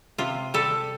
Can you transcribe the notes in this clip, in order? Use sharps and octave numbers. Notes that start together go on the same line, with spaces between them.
C3 F4
G3 A4